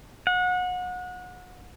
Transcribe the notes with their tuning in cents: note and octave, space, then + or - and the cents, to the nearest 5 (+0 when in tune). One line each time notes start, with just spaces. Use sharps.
F#5 -30